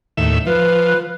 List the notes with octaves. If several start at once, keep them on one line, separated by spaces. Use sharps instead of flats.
D#2 A2 E5
F3 B4